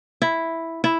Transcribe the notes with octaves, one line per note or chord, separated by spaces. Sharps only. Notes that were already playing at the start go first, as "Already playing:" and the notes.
E4
E4